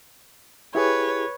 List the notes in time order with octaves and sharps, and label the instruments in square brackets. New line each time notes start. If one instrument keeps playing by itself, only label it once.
[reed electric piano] E4 G4 G#4 [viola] B4 C#5